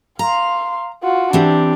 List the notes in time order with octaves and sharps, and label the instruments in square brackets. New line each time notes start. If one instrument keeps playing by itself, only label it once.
[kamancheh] F5 C6 [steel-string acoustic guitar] A#5
[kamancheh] F4 F#4
[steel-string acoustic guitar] E3 C4 G4 [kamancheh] D4